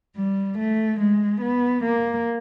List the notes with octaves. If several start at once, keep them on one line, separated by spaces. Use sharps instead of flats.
G3
A3
G#3
B3
A#3